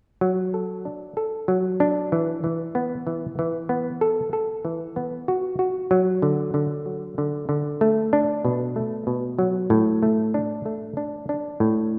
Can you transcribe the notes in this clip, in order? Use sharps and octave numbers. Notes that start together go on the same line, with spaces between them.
F#3
A4
D4
A4
F#3
D4
E3
E3
B3
E3
E3
B3
A4
A4
E3
B3
F#4
F#4
F#3
D3
D3
F#3
D3
D3
A3
D4
B2
A3
B2
F#3
A2
A3
D4
A3
D4
D4
A2